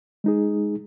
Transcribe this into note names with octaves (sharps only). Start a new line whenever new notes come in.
G#3 D#4 G#4